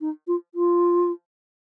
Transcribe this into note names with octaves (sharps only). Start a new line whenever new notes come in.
D#4
F4
F4